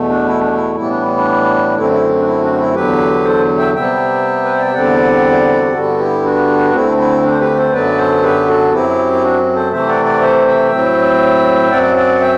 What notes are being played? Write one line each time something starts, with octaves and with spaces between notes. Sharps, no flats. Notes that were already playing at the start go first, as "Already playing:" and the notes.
Already playing: E2 B2 A3
D4
E4
D4
E4
A2 E3 G3 B3 E4
D4
D4
F#2 D3 A3 C4 E4
E4
D4
E4
D4 F#4
D4
E4
E2 D3 F#3 G4 B4
A4 C5
E5 G5
C3 G3 B3 E5 G5
B4
C5
D5
E5
E2 D3 G3 C4 D5 F#5
E4
F#4
G4
G2 D3 G3 B3 F#4 A4
E4 G4
D4 F#4
D2 D3 A3 C4 E4
E4
D4
C5
G4 B4
A4 C5
F#2 D3 F#3 B3 B4 D5
A4 C5
G4 B4
F#4 A4
F#2 F#3 C4 E4 G4
E4
D4 F#4
A4 C5
C3 E3 A3 C4 C5 E5
D5 F#5
D5 F#5
C5 E5
E5 G5
A2 F#3 C4
F#2 F#3 C4 D5 F#5
D5 F#5
E5 G5